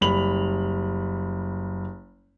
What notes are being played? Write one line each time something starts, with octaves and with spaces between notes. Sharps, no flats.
F#1 G3 B5 F7 F#7